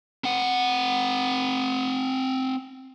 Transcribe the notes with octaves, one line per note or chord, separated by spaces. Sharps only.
C4 F#5